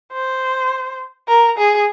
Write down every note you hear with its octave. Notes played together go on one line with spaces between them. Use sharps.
C5
A#4
G#4